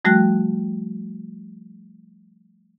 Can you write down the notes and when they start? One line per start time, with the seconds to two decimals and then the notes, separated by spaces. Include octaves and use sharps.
0.05 F3 G3 A3 F#4 G5 F#6